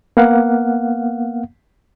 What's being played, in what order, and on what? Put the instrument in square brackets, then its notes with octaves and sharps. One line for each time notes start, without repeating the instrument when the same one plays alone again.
[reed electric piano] A#3 B3 F5 F#5